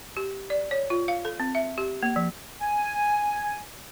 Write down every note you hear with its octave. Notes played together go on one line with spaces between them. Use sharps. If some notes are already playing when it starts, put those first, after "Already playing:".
G4
D5
C#5
F4
F5
A4
C4
E5
G4
A#3
F3
G#5